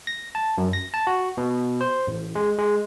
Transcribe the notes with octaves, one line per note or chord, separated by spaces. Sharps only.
A#6
A5
F#2
A#6
A5
F#4
B2
C5
A1
G#3
G#3